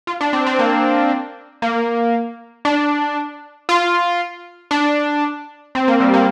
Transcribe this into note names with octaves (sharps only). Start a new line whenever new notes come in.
F4
D4
C4
C4
A#3
A#3
D4
F4
D4
C4
A#3
G3
A#3